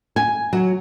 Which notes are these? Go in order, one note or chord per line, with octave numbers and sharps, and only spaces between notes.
G#5
F#3